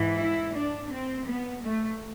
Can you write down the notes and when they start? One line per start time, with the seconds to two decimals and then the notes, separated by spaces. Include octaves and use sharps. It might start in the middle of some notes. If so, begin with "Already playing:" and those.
Already playing: G#2 E3
0.19 E4
0.56 D4
0.92 C4
1.27 B3
1.64 A3